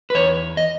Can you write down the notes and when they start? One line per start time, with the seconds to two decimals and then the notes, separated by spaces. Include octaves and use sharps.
0.10 B4
0.15 E2 C#5
0.57 D#5